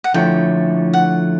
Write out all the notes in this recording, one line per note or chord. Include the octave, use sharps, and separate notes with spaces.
F#5
D3 F3 A3 C#4 E4 G5
F#5